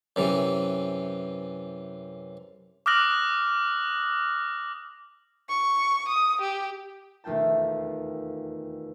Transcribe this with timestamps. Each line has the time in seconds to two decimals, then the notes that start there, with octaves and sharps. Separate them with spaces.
0.16 F#2 C3 E3
2.86 D6 D#6 F6 F#6 A#6 F#7
5.49 C#6
6.08 D#6
6.41 G4
7.24 E1 D#2 A3 F4 G5 A5